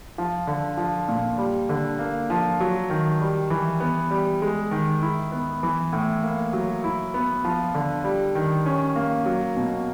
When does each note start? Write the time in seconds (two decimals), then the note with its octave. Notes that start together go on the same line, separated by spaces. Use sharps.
0.18 F3
0.47 D3
0.78 F3
1.08 A#2
1.38 G3
1.69 D3
1.99 A#3
2.30 F3
2.60 F#3
2.90 D#3
3.21 G3
3.50 E3
3.80 B3
4.11 G3
4.42 G#3
4.71 D#3
5.02 E4
5.32 B3
5.63 E3
5.93 A2
6.23 A#3
6.53 F#3
6.84 E4
7.14 B3
7.45 F3
7.75 D3
8.04 G3
8.35 D#3
8.66 C#4
8.96 A#3
9.26 F#3
9.57 B2